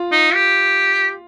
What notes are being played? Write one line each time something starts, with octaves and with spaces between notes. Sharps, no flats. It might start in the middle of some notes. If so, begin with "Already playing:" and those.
Already playing: F4
D#4
G4